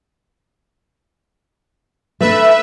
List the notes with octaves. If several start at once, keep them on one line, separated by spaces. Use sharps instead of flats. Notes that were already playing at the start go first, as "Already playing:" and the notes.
A3 D4 B4 E5